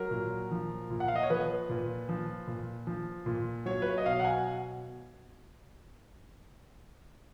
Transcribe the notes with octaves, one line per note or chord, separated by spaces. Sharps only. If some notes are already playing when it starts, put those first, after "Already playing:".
Already playing: F#3 A#4
A#2
F3
A#2
F#5
F5
D#5
C#5
F3 B4
A#2
F3
A#2
F3
A#2
F#3 C#5
B4
C#5
D#5
B2 F5
F#5
G#5